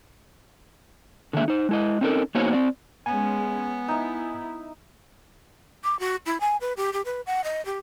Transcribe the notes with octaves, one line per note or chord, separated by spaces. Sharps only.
D3 D#3 G#3 A#3 E5
D#4 C5
G#3 E4 D#5
C4 C#4 D#4 A4 A#4
A#3 B3 D#4 F#4 C5 C#5
C4 D5
G#3 B3 C#4 G#5
D#4 E4 E5
D6
F#4
E4
G#5
B4
G4
G4
B4
F#5
D#5
G4